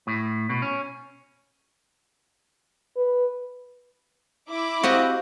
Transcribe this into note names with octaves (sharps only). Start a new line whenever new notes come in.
A2
B2
C#4
B4
E4 D6
C4 F#4 G4 D#5 F5